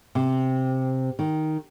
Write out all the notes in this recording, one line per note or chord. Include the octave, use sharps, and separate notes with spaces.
C3
D#3